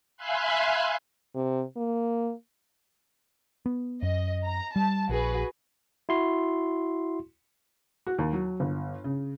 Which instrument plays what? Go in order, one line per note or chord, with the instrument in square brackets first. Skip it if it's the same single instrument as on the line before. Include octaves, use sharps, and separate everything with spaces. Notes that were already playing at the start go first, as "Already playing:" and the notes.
[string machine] E5 F5 G#5 B5 C6 F#6
[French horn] C3
A#3
[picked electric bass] B3
[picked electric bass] F#2 [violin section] D#5
[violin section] A#5
[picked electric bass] G3 [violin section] A5
[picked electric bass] A#1 [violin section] F#4 G#4 B4
[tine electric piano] E4 F#4 C6
[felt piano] F#4
D#2
F#3
G1
C#3